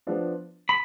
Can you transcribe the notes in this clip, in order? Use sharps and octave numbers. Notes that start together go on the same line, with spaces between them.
F3 B3 D4 F4
B5